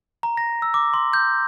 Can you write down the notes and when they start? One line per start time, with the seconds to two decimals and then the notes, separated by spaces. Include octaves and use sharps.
0.23 A#5
0.37 A#6
0.62 E6
0.74 D6
0.94 C6
1.13 G6